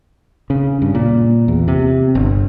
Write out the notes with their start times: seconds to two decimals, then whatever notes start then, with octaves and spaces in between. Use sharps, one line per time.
0.50 C#3
0.82 G2
0.95 A#2
1.48 E2
1.68 C3
2.15 G1